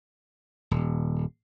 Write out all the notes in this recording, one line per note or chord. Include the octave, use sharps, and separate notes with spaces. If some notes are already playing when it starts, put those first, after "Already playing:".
D#1